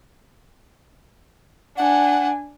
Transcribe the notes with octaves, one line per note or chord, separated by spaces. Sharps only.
D4 F#5 G#5